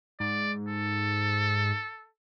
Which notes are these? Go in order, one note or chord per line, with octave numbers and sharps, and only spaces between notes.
G#2 D5
A4